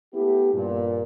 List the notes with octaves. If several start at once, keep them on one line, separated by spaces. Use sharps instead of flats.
A3 B3 E4 G4
G2 A#2